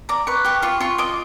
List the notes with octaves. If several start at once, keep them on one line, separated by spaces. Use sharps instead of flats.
D5 A#5
B4 C#6
G4 C#6
F4 C#6
F4 C#6
D#5 D6